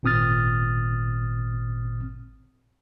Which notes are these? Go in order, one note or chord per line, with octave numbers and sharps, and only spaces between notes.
G#1 A#2 C4 D#6 F6 A6